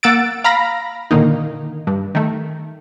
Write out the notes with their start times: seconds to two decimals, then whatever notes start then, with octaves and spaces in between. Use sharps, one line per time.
0.03 A#3 F#5 E6 A6 D7
0.44 F5 A#5 B5 A#6
1.11 A#2 D3 D#3 A#3 D#4
1.87 G2
2.15 D#3 A3